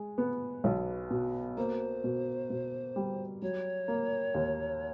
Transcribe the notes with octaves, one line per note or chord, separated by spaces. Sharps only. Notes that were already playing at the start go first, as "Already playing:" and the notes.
Already playing: G#3
B3
B1
B2
A#3 C5
B2
B2
G3
F#3 C#5
A#3
D#2